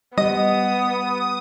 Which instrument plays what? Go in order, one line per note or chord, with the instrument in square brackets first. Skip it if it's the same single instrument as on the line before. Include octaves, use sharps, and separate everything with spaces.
[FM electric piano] G3 [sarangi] B3 [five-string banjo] D#5 [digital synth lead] D#6